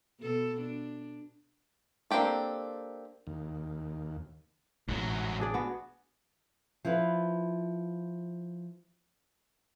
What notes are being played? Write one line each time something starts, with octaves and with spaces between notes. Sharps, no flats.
B2 A4
D4
A#3 C4 D4 G4 A4
D#2
A1 G#2 F#3
D4 G#4 D5
B3 F#4
F3 E4 F4 B4